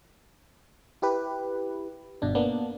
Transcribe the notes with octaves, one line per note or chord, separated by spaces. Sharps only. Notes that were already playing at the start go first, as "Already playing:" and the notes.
E4 G4 B4
G1 B2 D4
A#3 B3 D4